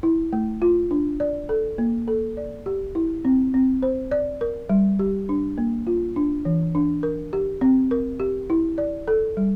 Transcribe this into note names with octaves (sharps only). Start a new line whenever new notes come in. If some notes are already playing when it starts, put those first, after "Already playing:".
E4
A3
F4
D4
D5
A4
A#3
A4
D5
G4
E4
C4
C4
C5
D5
A#4
G3
G4
D4
A#3
F4
D4
E3
D4
A#4
G4
C4
A#4
G4
E4
D5
A4
G3